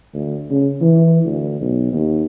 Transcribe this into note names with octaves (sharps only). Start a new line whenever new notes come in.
D2
C#3
E3
D2
B1
D#2